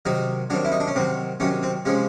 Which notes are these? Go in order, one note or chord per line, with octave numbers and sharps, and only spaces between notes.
C3 D#3 F#3 D#4
C3 D#3 F#3 D4
E4
D#4
D4
C#4
C3 D#3 F#3 C4
C3 D#3 F#3 C#4
C4
C3 F3 G#3 C#4